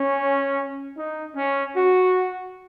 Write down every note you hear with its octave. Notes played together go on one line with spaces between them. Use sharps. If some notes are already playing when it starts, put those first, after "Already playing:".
Already playing: C#4
D#4
C#4
F#4